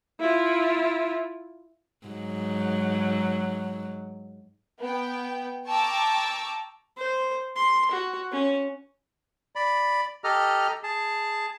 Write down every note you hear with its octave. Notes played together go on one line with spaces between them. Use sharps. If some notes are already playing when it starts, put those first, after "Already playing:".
E4 F4
G#2 F#3
B3 G5
G5 A5 A#5 C#6 D6 E6
C5
C6
F#4
C#4
D5 B5
G4 A4 D#5 A#5 F6
G#4 A5